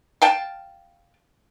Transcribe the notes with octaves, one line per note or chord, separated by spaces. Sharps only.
F5 G5 A5